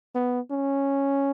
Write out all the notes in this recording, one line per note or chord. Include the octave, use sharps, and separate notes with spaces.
B3
C#4